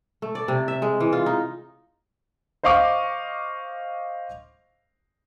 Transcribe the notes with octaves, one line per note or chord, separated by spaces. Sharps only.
A3
D5
C3
E5
G#3
E3
F4
D#4
C5 D#5 F5 C#6 D6